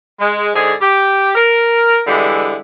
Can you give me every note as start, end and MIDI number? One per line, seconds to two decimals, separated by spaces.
0.20 0.49 56
0.55 0.73 44
0.55 0.73 50
0.55 0.73 68
0.81 1.35 67
1.36 2.01 70
2.07 2.58 50
2.07 2.58 52
2.07 2.58 55
2.07 2.58 56
2.07 2.58 64